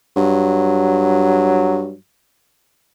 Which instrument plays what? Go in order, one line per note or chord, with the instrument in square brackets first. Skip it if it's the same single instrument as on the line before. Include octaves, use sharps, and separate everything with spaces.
[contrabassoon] G2 [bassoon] F#3